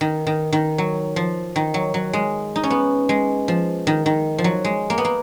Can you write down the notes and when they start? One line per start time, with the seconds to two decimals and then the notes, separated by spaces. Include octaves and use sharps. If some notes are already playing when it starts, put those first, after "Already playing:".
0.01 D#3
0.27 D#3
0.53 D#3
0.78 F#3
1.16 F3
1.56 D#3
1.74 F#3
1.94 F#3
2.13 G#3
2.56 D#4
2.63 C#4
2.71 B3
3.09 G#3
3.48 F3
3.87 D#3
4.06 D#3
4.38 F3
4.44 F#3
4.65 G#3
4.90 A#3
4.98 B3
5.05 A#3